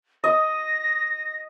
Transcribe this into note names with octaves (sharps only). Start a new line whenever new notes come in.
D#5 A#6